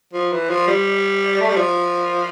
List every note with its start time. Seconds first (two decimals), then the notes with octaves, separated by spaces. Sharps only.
0.13 F3
0.32 E3
0.50 F3
0.68 G3
1.41 A3
1.49 G3
1.56 F3